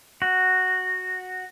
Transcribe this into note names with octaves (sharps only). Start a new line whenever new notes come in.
F#4